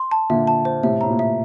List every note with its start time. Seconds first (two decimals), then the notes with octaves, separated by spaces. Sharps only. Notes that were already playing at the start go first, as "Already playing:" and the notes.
Already playing: C6
0.11 A5
0.30 A#2 D3 E5
0.47 A5
0.65 C5
0.83 A2 C3 E5
1.01 A2 A#5
1.10 A#2
1.19 E5